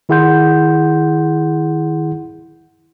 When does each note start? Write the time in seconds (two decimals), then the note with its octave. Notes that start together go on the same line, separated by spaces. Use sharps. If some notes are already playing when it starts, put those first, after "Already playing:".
0.09 D#3 E4 G#4 F#5 C6 G6